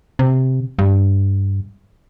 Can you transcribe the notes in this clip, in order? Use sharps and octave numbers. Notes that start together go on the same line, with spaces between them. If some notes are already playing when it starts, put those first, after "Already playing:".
C3
G2